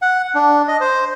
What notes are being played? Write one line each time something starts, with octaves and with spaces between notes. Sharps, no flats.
F#5
D4
D#5
C5